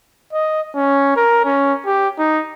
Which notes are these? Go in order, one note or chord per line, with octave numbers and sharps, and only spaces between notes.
D#5
C#4
A#4
C#4
G4
D#4